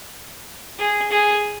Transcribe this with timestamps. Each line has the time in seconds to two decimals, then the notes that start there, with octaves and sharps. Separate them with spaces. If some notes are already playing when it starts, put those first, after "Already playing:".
0.79 G#4
1.10 G#4